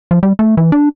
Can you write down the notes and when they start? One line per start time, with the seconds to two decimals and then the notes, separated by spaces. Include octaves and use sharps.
0.11 F3
0.23 G3
0.39 A3
0.57 E3
0.72 D4